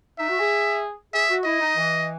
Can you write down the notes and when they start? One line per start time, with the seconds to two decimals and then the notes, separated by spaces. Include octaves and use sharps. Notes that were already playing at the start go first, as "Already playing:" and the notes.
0.18 D#4 E5
0.28 F#4
0.39 G#4
1.13 G#4 E5
1.29 F#4
1.44 E4 D#5
1.60 D#4
1.76 E3